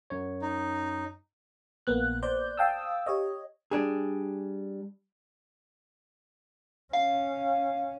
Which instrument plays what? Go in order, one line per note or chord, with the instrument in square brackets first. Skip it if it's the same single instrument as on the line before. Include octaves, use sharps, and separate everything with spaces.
[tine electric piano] F#2 C#5
[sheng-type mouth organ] D#4
[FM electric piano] A#1 A#3 B3 F#6
C5 D5 G6
F5 G5 A5 D#6 E6
G4 C#5 D#5
[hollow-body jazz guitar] G3 D4 G#4
[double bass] C#4 [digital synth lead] F5